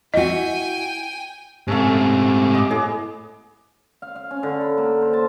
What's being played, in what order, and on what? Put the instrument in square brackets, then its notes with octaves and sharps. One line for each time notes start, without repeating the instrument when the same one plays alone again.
[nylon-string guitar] E4 F#4 [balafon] D#5 [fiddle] G5 G#5
[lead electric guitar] G#2 A3 [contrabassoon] C3 [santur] C#4 A4 F5
[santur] D#5 D6
[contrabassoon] A2 [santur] B3 G#4
[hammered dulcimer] F5
F5
C#4
D3
B5
A#3
C5
A5